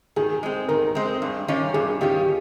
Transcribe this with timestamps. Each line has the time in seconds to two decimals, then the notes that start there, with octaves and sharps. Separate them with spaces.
0.16 D#3 G#4
0.43 G#3 C4
0.68 D#3 A#4
0.95 G#3 C4
1.22 G2
1.48 D#3 G3 C#4 F4
1.74 G2 G#4
2.01 D#3 G3 C#4 F4 G4